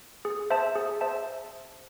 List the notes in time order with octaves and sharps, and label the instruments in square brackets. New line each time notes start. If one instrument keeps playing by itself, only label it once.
[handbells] G#4
C5 E5 A5
G#4
C5 E5 A5